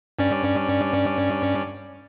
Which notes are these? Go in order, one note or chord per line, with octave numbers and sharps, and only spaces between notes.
G2 C#4 D5